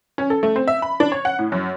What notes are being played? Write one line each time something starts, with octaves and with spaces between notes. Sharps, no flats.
C#4
A4
A3
C4
E5
B5
D4
C#5
F#5
A2
F#2